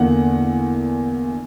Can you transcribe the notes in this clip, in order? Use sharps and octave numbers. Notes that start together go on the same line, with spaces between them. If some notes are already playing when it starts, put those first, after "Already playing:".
Already playing: E2 D3 A#3 F#5